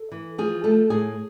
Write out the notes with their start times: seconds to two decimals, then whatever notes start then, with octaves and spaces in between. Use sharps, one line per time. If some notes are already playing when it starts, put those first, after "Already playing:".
Already playing: A4
0.12 E3
0.38 F3 G#4
0.64 A3 A4
0.90 A2 G#4